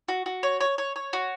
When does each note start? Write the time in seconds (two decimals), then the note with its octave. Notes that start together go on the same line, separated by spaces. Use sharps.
0.08 F#4
0.26 F#4
0.43 C#5
0.61 C#5
0.78 C#5
0.96 C#5
1.13 F#4